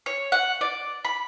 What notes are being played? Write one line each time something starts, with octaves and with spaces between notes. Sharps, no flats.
C#5
F#5
D5
B5